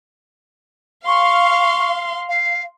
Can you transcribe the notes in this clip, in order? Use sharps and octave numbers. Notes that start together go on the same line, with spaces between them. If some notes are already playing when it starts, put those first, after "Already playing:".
F5 C6 C#6
F5